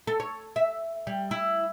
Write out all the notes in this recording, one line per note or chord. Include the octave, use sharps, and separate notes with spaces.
A4
C#5
E5
G3
E4